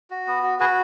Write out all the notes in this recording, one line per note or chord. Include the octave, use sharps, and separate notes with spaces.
F#4
B3
F#4
F#4 G#4 B4